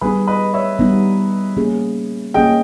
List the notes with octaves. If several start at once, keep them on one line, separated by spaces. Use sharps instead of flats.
G3 B3 D#4 G#4 B4
B4 D#5
C#5 E5
G3 B3 D#4
A#3 C#4 G#4
A#3 C#4 G#4 D#5 G5